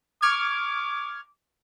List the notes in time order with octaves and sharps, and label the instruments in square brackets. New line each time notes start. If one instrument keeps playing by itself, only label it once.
[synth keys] C#6 F6 G#6 [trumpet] D6